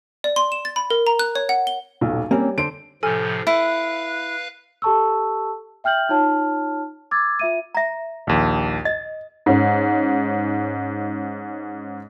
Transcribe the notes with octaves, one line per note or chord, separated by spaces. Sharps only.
D5
C6
E7
A6
B5
A#4
A#5
F#6
C#5
F#5
G7
D#1 B1
G3 A#3 C4 C#4
D3 C5 D7
A2 C3 F3 A4 G#5 F6
E4 B4 F5 F#6
G4 A4 A5 C#6 E6
E5 G5 F6 G6 F#7
D#4 F4 C#5 A5 F6
D6 E6 G#6 A6
F4 E5 D#7
E5 A#5
A#1 D#2
D#5 A6
G#2 C#4